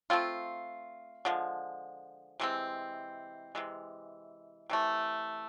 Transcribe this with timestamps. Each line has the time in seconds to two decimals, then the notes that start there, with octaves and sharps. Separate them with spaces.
0.10 A3 C4 F4
1.25 D3 F3 G#3
2.40 C3 E3 G#3 C4
3.55 C3 E3 G#3
4.70 C3 E3 A3